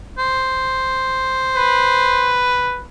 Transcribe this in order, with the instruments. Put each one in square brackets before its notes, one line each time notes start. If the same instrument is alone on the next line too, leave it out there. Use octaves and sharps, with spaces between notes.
[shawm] C5
[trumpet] B4